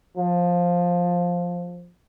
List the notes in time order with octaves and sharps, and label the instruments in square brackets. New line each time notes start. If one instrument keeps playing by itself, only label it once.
[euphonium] F3